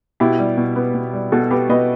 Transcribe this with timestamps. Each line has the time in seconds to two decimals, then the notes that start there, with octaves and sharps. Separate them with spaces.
0.20 B2 E4 G4
0.39 G3
0.57 B2
0.76 B3
0.95 B2
1.13 G3
1.32 B2 F#4 A4
1.51 B3 G4 B4
1.69 B2 B4 D#5